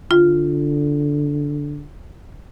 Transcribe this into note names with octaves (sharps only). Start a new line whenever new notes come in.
D3 F4